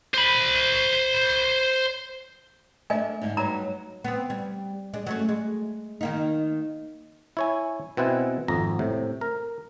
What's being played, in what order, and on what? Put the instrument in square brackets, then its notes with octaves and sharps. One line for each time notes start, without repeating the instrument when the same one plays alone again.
[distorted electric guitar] C5 B5
[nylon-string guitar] A3 D4 [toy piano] D#5 E5 G#5
[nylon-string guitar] G#2 D3
[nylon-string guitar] G2 F#3 D#4 [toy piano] A#5
[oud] B3 C4
G3
G#3 D4
F#3 A3 C#4
G#3
D#3 A#3 D#4
[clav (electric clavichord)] E4 C#5 G#5
B2 C4 E4 F#5 G#5
G#1 F2 A#5
A2 C3
A#4